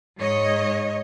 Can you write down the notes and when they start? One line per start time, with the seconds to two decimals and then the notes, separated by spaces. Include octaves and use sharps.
0.18 G#2 C#5 D#5